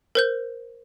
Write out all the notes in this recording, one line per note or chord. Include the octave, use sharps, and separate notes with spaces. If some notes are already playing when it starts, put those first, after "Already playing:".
A#4 C5 G6